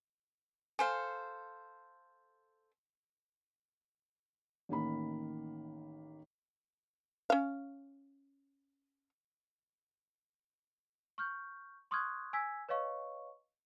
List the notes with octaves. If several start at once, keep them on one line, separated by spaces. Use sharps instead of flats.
A4 C5 F5 G#5
A1 D#3 A#3 B5
C#4 F5
C#6 F6 G6
C6 C#6 D#6 F6 F#6 G#6
G#5 E6 G#6 B6
B4 C#5 D#5 F5 C#6